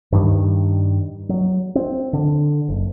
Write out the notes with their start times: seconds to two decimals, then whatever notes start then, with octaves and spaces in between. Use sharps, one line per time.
0.12 G2 D#3 G3
1.29 F#3
1.75 C4
2.13 D3
2.68 F#1